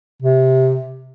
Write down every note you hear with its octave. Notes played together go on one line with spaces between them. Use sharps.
C3